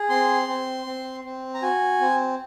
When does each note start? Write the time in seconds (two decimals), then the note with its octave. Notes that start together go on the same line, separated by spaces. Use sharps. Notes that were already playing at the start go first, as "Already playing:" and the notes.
Already playing: G#4
0.10 C4 C6
0.48 C4
0.86 C4
1.24 C4
1.54 A#5
1.62 F#4 G#5
2.01 C4